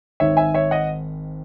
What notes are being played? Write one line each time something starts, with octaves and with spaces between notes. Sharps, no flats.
G#1 G#2 D#3 C#5 E5
E5 G#5
C#5 E5
D#5 F#5